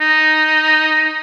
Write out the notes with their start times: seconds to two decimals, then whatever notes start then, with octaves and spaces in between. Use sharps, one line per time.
0.01 D#4